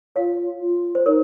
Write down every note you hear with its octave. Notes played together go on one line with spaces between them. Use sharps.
F4 C#5 F5
F4
C5
D#4 A#4 C#5